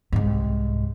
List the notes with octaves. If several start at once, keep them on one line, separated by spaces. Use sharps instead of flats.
C2 G#2